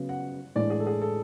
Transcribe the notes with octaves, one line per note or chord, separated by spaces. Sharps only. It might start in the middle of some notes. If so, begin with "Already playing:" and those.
Already playing: C#3 F#3 B3
F#5
A2 E3 G#3 D4 D5
G#4
A4
G#4
A4